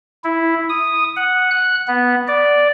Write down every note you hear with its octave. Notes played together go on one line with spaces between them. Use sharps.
E4
D#6
F#5
F#6
B3
D5